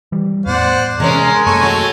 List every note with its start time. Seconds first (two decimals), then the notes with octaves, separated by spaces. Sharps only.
0.12 E3 G3
0.46 E2 A2 B3 C5 D5 F#5
1.00 C3 E3 G#3 C#4 A#4
1.46 F#2 A3 A#3 A4 G#5 C#6
1.63 F#3